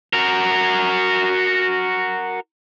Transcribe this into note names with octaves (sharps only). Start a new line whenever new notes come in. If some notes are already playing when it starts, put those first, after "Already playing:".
F#4 A#4